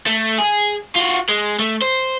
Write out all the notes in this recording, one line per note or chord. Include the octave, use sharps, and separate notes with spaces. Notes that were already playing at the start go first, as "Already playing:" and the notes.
A3
G#4
F4 F#4
G#3
A3
C5